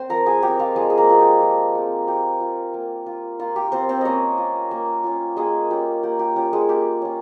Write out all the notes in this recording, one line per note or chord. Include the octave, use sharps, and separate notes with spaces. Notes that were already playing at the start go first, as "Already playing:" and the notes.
Already playing: C4 C5 C6
F3 A#4 A#5
G#4 G#5
G#3 C4 G4 G5
F4 F5
F3 G#3 G#4
G#4
A#3 A#4
G#3 C4 F4
G4
F3
G#3 C4
A#3 G4
F4
A#3
F4
A#3 F4
G4
C4 F4 C5
C4 C5
A#3 C#4 C#5 D#5
F4
A#3
C#4 F4
G#3 A#3 G#4
C#4 F4 G4
A#3 G4
G4
C#4 F4 G4
G#3 G#4
A#3 G4
C#4 F4